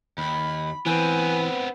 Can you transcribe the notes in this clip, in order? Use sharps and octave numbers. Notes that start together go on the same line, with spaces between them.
D#2 B5
E3 B3 C4 B4 G#5